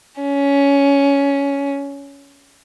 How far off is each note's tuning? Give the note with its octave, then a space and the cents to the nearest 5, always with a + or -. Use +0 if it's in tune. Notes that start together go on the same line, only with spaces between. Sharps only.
C#4 +15